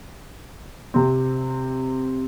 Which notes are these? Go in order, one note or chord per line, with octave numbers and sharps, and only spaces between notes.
C3 C4